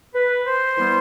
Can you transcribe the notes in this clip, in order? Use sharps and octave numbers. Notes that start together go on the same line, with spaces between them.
B4
C5
E3 G3 B3